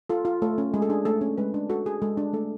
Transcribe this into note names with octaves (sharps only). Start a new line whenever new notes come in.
F4 A4
F4
A3 A4
C#4
G#3 G#4
A4
D4 G#4
A3 A4
C#4
G#3 B4
D4
F#4 A4
F#4 G#4
G#3 A4
D4
A3 A4